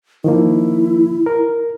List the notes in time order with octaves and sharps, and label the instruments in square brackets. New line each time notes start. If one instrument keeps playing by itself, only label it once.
[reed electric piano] D#3 F3 A#3 [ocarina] E4
[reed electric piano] A#4